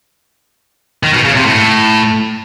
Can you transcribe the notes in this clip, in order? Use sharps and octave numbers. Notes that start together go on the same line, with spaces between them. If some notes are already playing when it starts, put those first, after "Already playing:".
D#3
B2
C#3
C3
A2